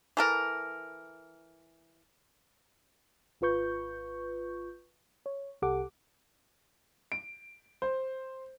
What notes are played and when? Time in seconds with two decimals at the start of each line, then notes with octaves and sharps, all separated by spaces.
0.17 E3 A4 A#4
3.41 G#1 F4 B4 C#6 G6
5.26 C#5
5.62 C2 G4 A4 F#5 D6
7.12 D7
7.82 C5